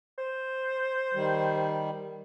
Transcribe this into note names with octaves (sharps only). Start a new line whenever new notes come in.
C5
D#3 G3